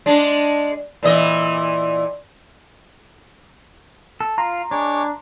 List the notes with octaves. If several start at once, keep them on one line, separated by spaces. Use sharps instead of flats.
G#3 D4
A#2 E3 D#5
A4
F4 A#5 C6
G#3 D4 C#5 D6